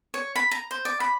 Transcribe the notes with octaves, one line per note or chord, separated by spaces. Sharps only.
C#5
B5
A#5
C5
D5
B5